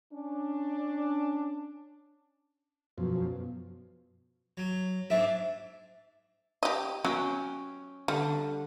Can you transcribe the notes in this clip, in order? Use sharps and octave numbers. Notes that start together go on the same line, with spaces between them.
C#4 D4
F#2 B2 F3
F#3
G#2 D4 E5
G4 D#5
F#3 C#4 G5
D3 G3